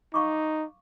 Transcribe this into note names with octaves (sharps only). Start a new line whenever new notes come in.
D#4 F5 C#6 D6